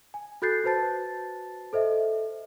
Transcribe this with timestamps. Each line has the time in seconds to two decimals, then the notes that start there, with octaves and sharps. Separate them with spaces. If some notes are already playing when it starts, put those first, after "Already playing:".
0.14 G#5
0.42 F#4 A4 F#6 G6 A6 C7
0.64 F#4 B4 C5 A5 A6
1.73 A4 C5 D#5 E5